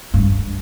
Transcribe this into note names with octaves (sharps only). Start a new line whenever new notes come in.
G2